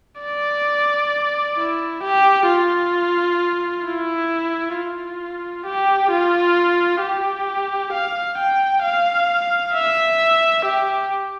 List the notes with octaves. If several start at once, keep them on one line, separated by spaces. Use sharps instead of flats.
D5
E4
G4
F4
E4
F4
G4
F4
G4
F5
G5
F5
E5
G4